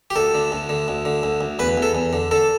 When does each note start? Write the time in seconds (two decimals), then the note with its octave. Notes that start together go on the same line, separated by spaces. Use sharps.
0.10 G4
0.16 D2 A4
0.35 D3
0.52 D2
0.69 D3
0.88 D2
1.05 D3
1.23 D2
1.41 D2
1.59 E2 B4
1.78 E2 A4
1.95 E2
2.13 D3
2.31 D3 A4